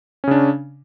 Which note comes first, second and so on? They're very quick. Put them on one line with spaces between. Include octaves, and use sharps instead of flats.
C#4 C#3 D4